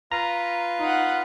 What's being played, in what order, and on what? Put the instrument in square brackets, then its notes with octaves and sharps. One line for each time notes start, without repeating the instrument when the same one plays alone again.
[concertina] F4 B4 F5 [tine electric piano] A#5
[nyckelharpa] D#4 F#5